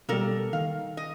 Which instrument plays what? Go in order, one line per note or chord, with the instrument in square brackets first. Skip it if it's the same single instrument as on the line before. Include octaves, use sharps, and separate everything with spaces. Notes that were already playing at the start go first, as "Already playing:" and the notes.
[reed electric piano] B2 G3 [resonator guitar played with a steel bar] A#3 A4 A#4
[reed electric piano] D#3 [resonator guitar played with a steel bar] F5
[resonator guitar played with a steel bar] D#5